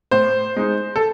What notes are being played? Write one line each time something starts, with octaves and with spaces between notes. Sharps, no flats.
A2 C5
G#3 D#4
A4